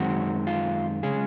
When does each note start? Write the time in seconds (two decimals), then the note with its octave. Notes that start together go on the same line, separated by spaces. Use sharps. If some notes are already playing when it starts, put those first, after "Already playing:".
Already playing: F#2 D#3 G#3 C4 F#4
0.47 F4
1.03 C#3 G#3 C#4 G#4